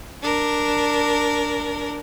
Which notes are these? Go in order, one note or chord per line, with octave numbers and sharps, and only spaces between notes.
D4 A#4